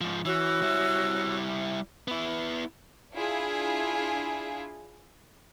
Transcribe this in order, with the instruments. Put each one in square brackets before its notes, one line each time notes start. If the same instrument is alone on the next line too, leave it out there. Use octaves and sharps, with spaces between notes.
[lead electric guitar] G#2 F3
[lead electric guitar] E3 [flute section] C#4 F#4 E6
[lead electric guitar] G3 E4
[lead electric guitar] B3 E4 [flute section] B5
[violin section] D4 E4 F4 G#4